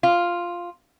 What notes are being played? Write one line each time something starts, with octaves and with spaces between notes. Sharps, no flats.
F4